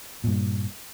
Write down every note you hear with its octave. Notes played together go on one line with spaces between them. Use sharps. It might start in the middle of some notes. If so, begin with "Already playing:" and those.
G2 A#2